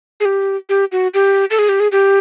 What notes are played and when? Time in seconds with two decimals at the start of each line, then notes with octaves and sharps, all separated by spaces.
0.20 G#4
0.25 G4
0.69 G4
0.92 F#4
1.14 G4
1.51 A4
1.59 G#4
1.69 G4
1.80 G#4
1.92 G4